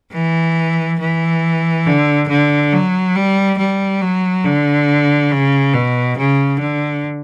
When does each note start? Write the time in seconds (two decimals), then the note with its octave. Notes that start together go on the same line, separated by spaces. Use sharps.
0.13 E3
1.00 E3
1.86 D3
2.28 D3
2.72 F#3
3.15 G3
3.58 G3
4.01 F#3
4.44 D3
5.31 C#3
5.73 B2
6.18 C#3
6.60 D3